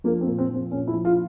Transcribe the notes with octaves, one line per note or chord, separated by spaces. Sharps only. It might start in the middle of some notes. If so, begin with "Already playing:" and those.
F3 A#3
C4
A#2
C4
F3
C4
A#2 C#4
E4
F3
F4